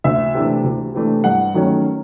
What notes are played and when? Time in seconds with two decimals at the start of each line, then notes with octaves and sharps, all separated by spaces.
0.04 D2 E5
0.34 C3 E3 A3 D4
0.64 D2
0.94 C3 E3 A3 D4
1.24 G2 F#5
1.54 D#3 F#3 A3 C#4